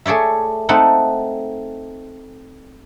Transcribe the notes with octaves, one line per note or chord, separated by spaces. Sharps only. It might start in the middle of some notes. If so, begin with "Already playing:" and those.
A3 G#4 C#5 D5 E5
A3 C4 D#4 A4 F#5